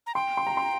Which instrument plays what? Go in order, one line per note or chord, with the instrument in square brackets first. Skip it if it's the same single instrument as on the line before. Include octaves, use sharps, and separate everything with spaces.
[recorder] A#5
[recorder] G5 [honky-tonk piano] C6
[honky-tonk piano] C6
A#5
C6